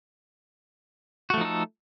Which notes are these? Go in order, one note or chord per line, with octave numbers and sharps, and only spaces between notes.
F3 A3 D#4 F#4 A4